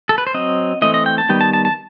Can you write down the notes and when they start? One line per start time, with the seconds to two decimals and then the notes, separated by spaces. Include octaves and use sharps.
0.09 A4
0.18 B4
0.27 C5
0.34 F#3 C4 D#5
0.82 E3 A3 C4 D#5
0.94 D#5
1.06 G5
1.18 A5
1.29 D#3 G3 B3 G5
1.41 A5
1.53 A5
1.65 A5